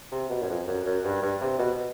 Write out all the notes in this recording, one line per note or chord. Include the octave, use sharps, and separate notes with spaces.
C3
B2
F#2
F2
F#2
F#2
G2
G2
C3
B2